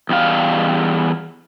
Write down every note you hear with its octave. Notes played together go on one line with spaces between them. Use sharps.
E2 G3 F5